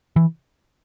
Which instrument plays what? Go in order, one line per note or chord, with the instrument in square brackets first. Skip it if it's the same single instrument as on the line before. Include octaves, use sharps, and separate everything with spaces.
[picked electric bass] E3